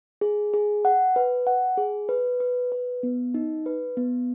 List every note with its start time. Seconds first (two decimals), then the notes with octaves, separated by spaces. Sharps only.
0.21 G#4
0.54 G#4
0.85 F#5
1.16 B4
1.47 F#5
1.77 G#4
2.09 B4
2.40 B4
2.72 B4
3.03 B3
3.34 D#4
3.66 B4
3.97 B3